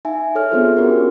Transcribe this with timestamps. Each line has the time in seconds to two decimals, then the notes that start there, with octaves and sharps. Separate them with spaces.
0.05 D#4 E5 G#5
0.35 A4 C#5 E5 F6
0.51 B3 C4 D4 F4 G#4 C5
0.77 C#4 F#4 G4 A#4